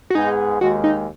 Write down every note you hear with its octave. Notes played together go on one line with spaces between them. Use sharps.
F#4
G#2 G#3 B3 D#4 G#4
D#2 D#3 G#3 F#4
D#4